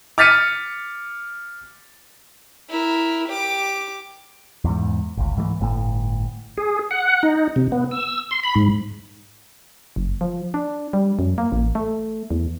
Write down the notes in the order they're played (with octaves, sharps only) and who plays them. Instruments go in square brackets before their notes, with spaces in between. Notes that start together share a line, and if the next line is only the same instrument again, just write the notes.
[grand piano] D6 F6 A6 B6 C#7 D#7
[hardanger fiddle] E4 A#4
G4 D6
[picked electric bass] E2 G#2
G1 C#2
G#2 E3 G3 A3
G1 A2
[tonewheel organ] G#4
F#5
D#4
C3
B3
E6
C6
B5
G#2
[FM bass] F#1
F3
D4
G3
F#2
A#3
A1
A3
E2